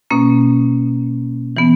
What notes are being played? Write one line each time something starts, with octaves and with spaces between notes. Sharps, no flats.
B2 A#3 C#4
E3 B3